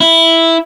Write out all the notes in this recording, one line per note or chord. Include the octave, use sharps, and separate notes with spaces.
E4